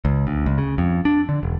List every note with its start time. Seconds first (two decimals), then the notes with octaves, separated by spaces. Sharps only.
0.05 C#2
0.27 D2
0.46 C#2
0.58 C#3
0.78 F2
1.05 D4
1.29 D3
1.43 E1